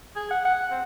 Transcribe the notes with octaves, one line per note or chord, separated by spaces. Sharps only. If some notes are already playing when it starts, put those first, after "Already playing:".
G#4
F#5
F#5
C4